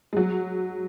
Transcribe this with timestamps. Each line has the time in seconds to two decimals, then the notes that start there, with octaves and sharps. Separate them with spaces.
0.13 G#3
0.17 F#3